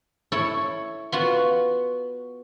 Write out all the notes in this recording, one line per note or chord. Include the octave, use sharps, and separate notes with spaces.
E4 A4 C#5
B3 F4 F#4